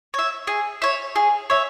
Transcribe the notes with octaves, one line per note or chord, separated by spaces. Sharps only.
C#5 E5
G#4
C#5 E5
G#4
C#5 E5